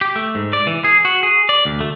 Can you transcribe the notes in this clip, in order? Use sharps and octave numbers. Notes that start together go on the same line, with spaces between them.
G4
A3
G#2
D5
E3
G#4
F#4
G#4
D5
D2
A3